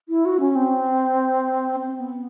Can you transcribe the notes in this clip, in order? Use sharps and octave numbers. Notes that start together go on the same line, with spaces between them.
E4
F#4
C#4
C4
C4
B3